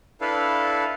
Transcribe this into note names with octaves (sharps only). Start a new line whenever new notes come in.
D4 E4 A4 B4 F5